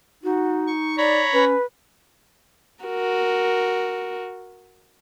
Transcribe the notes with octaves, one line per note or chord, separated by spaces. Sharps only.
D#4 F#4
C#6
C#5 D5 A#5 B5
C#4 B4
F#4 A#4